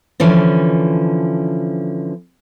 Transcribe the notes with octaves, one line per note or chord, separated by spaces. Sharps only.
D3 E3 F3 C#4